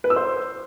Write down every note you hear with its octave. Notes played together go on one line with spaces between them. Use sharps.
B4
E6
C5